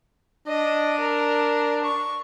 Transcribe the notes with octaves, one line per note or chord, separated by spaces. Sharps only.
D4 D#5
A#4
C#6